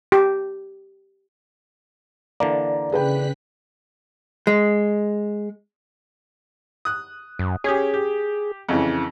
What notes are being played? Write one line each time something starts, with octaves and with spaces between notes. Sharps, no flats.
G4
D3 E3 A#3 D5 A#5
C#3 G#4 B4 G5 F#6 B6
G#3
D#6 F#6
F#2
C#4 G4 G#4
G4
F2 C#3 E3